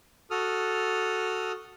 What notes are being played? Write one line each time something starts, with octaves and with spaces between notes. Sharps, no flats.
F#4 A4 D#6 F6